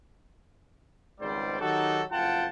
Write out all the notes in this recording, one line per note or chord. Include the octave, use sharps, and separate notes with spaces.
G#1 C#2 G#2 G3 C5 D5
D#3 F#3 D#4 F#4 G4 A4
F#1 F2 F4 F#5 G5 A5